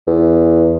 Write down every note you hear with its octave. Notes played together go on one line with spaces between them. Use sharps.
E2